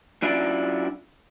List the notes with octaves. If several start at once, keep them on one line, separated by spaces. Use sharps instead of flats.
F#2 D4 E4 F4 D5